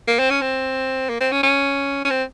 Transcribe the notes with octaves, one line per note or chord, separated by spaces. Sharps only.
A#3
C4
C#4
C4
A#3
C4
C#4
C#4
C#4
C4